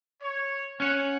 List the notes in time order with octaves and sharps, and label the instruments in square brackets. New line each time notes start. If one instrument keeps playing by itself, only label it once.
[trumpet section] C#5
[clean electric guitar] C#4 C#5 [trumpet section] F#5